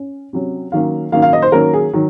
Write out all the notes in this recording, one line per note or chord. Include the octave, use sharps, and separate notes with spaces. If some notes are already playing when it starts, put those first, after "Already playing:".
Already playing: C#4
C3 F#3 C#4
D#3 F#3 A#3 C#4 F5
D#3 F#3 A#3 C#4 F5
F5
D#5
C5
D#3 F#3 A#3 C#4 A#4
G#4
D#3 F#3